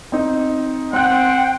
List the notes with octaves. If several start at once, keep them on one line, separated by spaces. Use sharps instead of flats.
C4 D#4
C4 C5 F#5 G5 F#6